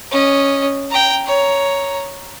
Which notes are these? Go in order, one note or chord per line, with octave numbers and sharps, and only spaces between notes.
C#4 D#5
G5 A#5
C#5 A#5